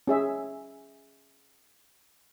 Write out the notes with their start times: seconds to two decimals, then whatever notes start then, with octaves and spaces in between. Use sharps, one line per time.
0.07 C#4 G#4 E5